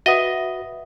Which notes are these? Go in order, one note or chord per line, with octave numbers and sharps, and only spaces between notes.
F#4 B4 D#5 E5 F#5 D#6